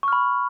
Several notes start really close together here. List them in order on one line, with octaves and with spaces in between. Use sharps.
C#6 F6 B5